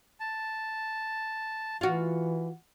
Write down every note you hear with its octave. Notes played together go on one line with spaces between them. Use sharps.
A5
E3 F4 F#4